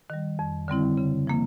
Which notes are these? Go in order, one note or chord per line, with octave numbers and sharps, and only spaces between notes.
D#3 G3
F2
D3 G3 C4 E4
C#3
F3 A#3